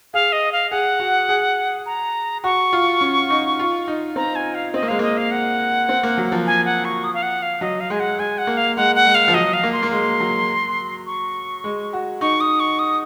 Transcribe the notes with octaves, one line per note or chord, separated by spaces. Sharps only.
G#4 F5
D#5
F5
G#4 F#5
F#4
G#4
A#5
F#4 C#6
F4
C#4
D#4
F4
D#4
C4 A#5
G#5
F5
C4 D#5
A#3
G#3 F5
A#3 D#5
F5
F#5
C4
A#3
F#3
F3
G#5
F#5
C#6
D#6
F5
F#5
F5
F#3 D#5
F5
G#3 G#5
F#5
G#3 G#5
F#5
A#3
F5
G#3 F#5
F#5
G#3
F5
F3
F#3 D#5
F5
A#3
C6
A#3
G#3 C6
F#3
C#6
G#3
F#4
D#4 C#6
D#6
C#6
D#6